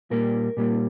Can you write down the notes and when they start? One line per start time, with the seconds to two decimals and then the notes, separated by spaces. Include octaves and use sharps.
0.11 A#2 G3 A#3 A#4
0.57 A#2 G3 A#3